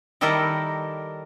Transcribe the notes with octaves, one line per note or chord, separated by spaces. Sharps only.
D#3 G3 E4 G4 A4 A#4